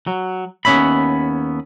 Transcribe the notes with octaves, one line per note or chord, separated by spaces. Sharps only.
F#3
D#2 B3 C#4 C#5 E5 B5